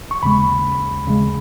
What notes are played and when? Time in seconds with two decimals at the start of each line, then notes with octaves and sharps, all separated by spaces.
0.11 C#6
0.23 D#2 C#3 G#3 B5
1.06 D#2 C#3 G#3